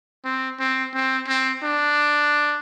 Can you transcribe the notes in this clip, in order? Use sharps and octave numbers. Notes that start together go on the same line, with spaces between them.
C4
C4
C4
C4
D4